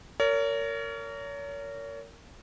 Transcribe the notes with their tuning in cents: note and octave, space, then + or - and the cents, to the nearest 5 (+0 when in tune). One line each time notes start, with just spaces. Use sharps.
A#4 -20 C#5 +35